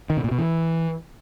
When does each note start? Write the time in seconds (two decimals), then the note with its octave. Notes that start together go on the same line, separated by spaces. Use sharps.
0.10 D#3
0.17 B2
0.24 A#2
0.31 B2
0.39 E3